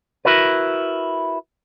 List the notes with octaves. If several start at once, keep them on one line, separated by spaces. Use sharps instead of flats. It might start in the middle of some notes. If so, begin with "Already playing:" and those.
E4 F#4 A#4 B4